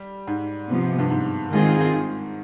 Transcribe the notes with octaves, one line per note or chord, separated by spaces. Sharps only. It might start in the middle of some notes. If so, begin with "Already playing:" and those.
Already playing: G3
G#2
C3 F3 B3
G2
G#2
D#3 G#3 C4 F4 G#4
D#3